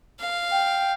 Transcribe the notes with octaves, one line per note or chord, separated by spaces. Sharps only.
F5
G5